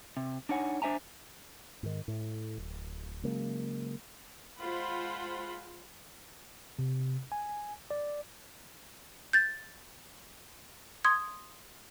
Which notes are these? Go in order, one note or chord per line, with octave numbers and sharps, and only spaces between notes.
C3
D4 D#4 C#5 F#5 G#5
D4 C5 E5 G#5 A#5
G#2 D#3
A2
D1
C#3 F#3 G#3 A#3
G#3 F4 C5 F#5 B5
C3
G#5
D5
G6 A6
C6 D#6 G#6